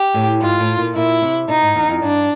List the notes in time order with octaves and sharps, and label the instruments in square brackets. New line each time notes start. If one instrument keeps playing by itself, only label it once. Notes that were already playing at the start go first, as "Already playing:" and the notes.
Already playing: [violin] G4
[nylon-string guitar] A2
[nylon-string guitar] G#2 [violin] F4
[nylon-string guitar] A2
A#2
[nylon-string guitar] A#2 [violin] E4
[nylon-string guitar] C3
[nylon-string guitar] B2 [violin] D#4
[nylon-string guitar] G#2
E2
F2
[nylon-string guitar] G2 [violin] D4